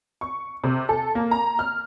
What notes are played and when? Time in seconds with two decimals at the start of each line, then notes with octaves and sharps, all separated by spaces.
0.21 C#6
0.64 C3
0.89 A4
1.15 A#3
1.31 A#5
1.59 F6